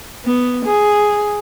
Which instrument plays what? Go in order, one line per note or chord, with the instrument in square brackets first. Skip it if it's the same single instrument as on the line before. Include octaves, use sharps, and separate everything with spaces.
[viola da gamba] B3
G#4